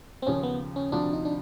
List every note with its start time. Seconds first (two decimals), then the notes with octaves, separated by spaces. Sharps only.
0.22 C4
0.26 D#2 C#3 F3 C#4
0.43 B3
0.76 C#4
0.92 D2 C3 F3 D4
1.13 D#4
1.25 D4